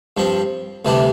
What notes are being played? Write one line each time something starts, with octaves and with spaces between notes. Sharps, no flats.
G2 F3 C4
D2 C3 E3 G3 D4